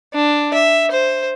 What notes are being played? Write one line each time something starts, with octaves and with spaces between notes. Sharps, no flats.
D4
E5
C5